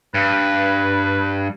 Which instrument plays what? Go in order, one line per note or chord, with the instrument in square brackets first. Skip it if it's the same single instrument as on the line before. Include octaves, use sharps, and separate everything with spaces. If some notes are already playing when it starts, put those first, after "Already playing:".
[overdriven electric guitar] G2 [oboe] B4